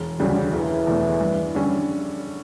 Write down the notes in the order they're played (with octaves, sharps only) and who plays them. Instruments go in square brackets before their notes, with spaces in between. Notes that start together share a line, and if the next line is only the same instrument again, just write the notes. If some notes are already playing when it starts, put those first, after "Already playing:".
Already playing: [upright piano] E1
[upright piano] D2 C#3 G3 [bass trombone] F#3
[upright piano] E1 [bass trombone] E3
[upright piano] E2 B2 A3
G2
D3 G3 C#4